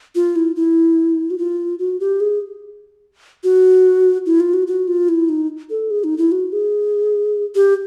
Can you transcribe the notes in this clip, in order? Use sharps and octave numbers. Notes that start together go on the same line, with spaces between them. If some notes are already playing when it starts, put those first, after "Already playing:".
F4
E4
E4
F#4
F4
F#4
G4
G#4
F#4
E4
F4
F#4
F#4
F4
E4
D#4
A4
G#4
D#4
E4
F#4
G#4
G4